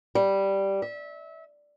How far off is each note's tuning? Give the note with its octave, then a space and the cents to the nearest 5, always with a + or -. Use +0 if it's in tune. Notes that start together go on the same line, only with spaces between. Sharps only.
G3 -5
E5 -25